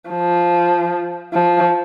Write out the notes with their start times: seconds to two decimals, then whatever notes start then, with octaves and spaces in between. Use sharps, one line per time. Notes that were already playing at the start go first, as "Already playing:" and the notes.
0.11 F3
1.33 F3